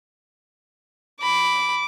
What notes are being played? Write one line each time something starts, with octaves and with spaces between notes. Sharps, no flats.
B5 D6